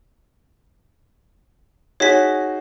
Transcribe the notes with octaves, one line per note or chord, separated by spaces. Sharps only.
D#4 F#4 G#4 C#5 B6